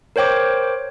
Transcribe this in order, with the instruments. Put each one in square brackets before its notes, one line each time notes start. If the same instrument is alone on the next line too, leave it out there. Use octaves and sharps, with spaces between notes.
[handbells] A#4 C5 C#5 G5 D6